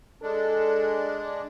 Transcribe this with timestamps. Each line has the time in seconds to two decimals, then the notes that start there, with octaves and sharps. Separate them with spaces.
0.22 G#3 D4 A4